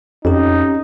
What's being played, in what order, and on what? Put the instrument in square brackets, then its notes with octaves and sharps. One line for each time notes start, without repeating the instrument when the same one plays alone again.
[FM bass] F2 [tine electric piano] C#4 G4 [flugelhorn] D#4